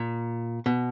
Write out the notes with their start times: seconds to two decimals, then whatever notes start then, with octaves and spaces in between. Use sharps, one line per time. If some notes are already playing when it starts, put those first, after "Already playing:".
Already playing: A#2
0.66 B2